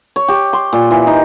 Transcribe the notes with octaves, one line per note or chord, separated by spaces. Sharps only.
C#5
G4
C6
A#2
E3
D#4